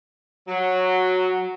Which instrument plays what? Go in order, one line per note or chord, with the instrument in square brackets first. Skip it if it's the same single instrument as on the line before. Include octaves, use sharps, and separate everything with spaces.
[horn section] F#3